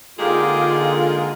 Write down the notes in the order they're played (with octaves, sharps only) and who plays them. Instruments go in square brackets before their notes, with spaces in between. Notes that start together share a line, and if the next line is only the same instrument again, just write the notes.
[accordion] D3 G#3 F4 [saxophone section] A#3 D#4 G#4 [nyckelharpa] G4